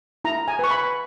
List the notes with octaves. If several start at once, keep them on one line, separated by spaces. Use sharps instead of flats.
E4 A#5
G#5
B4 C#6
B5